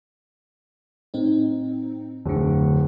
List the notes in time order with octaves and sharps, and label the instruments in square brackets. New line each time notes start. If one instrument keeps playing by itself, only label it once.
[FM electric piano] A2 C4 D#4
[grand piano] D1 [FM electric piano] F2 D3